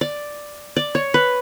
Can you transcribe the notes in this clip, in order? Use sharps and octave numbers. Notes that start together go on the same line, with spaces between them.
D5
D5
C#5
B4